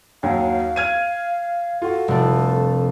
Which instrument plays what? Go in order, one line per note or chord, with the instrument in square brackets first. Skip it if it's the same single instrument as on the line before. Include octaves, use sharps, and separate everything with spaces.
[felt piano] D#2 F#3 [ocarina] F5
[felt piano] F6 G#6 D#7
[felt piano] F4 F#4 [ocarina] A4
[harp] F1 D4